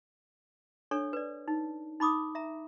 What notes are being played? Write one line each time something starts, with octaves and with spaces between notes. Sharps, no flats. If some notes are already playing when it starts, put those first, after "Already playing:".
D4 A4 C#5 C#6
B4 D5
D#4
D#4 B5 D6 D#6
E5 A#5